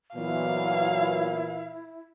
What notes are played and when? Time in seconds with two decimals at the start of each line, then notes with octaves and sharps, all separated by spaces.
0.16 A#2 E3 F#3 B3 E4 F5